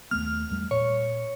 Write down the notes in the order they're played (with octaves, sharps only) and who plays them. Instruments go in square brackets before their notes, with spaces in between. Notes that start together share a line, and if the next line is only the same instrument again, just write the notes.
[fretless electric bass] D#2 A3 B3 [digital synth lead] F6
[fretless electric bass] E2 G3 A3
[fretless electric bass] A#2 [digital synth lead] C#5